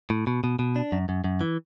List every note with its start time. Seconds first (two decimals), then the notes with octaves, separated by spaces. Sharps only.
0.10 A2
0.27 B2
0.44 B2
0.59 B2
0.76 D4
0.92 F#2
1.09 F#2
1.24 F#2
1.41 E3